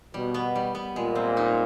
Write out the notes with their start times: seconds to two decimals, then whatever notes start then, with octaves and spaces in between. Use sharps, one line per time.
0.14 B2 G3
0.34 B3
0.55 G3
0.75 B3
0.96 A#2 G#3
1.15 C4
1.37 D#4